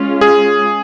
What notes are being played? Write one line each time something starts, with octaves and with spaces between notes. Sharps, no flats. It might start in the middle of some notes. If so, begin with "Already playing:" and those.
Already playing: G#3 C#4 F4
G#4